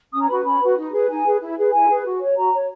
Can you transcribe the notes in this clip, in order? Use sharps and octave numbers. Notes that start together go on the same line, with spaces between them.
C#4 D#6
A#5
F#4 B4 B5
C#4 B5
F#4 B4
D#4
G#4 B4
D#4 G#5
G#4 B4
E4
G#4 B4
E4 G#5
G#4 B4
F#4
C#5
F#4 A#5
C#5